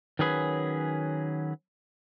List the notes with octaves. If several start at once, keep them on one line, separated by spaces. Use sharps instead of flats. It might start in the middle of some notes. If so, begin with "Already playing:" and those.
D#3 F#3 C#4 G#4 B4